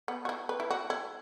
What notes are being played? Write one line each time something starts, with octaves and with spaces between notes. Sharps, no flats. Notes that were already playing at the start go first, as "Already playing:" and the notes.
B3
F#4
E4
B4
E4
F#4
E4